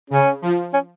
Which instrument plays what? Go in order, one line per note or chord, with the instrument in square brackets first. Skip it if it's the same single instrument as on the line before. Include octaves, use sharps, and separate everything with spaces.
[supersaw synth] C#3 [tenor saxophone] C#4
[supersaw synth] F3
[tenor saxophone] C#4